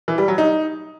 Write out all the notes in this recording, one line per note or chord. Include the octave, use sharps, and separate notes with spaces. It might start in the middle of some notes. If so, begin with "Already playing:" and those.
E3
G3
F#3
D#4